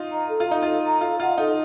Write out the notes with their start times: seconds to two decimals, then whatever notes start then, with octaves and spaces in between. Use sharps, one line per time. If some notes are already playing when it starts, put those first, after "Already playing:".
Already playing: D#4 F4
0.10 D#5 A#5
0.28 A4
0.40 F4
0.47 D#4 D#5 A#5
0.62 F4 A4
0.83 D#5 A#5
1.01 F4 A4
1.19 F4 D#5 F#5
1.38 D#4 A4